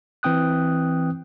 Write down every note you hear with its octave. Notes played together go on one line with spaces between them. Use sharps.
E3 C4 G5 D#6 F#6